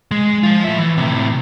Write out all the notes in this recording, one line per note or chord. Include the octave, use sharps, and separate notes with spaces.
G#3
F3 F4
A2 E5
E3
A2 C3